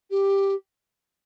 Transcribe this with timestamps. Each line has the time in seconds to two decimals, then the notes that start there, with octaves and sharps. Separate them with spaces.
0.10 G4